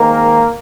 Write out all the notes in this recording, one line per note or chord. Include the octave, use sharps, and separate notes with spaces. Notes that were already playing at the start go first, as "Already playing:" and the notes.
Already playing: D#3 G#3 A#3 C4 A#4